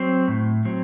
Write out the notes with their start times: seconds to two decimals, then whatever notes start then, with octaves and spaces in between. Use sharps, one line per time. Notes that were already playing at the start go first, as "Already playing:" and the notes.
Already playing: F#3 C4
0.28 A2
0.65 F#3 C4